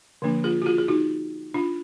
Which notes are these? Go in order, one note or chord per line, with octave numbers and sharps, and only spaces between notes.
D3 F3 A#3 D4
F4 G#4
F#4
F4 G#4
G#4
D#4 F#4
D4 F4